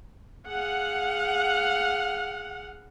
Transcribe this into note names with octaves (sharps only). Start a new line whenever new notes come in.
G#4 F5 F#5